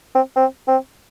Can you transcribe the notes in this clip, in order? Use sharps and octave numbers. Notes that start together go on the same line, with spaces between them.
C4
C4
C4